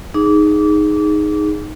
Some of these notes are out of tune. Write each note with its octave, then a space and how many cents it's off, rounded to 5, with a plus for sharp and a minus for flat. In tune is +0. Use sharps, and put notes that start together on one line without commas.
D#4 -5 G#4 +0 D6 -25